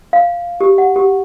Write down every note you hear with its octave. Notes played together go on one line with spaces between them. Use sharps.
F5
G4
F#5
G4